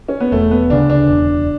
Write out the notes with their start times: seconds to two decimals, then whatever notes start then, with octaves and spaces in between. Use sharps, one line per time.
0.08 C#4
0.20 B3
0.32 E1 A3
0.51 B3
0.70 D2 C#3 D4
0.90 D4
1.08 E1